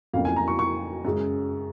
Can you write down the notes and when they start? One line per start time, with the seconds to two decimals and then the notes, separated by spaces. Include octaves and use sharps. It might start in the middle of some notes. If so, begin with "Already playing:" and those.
0.14 F2 C#3 F#3 A#3 F5
0.25 G#5
0.36 A#5
0.48 C#6
0.59 C#6
1.05 F#2 C#3 G#3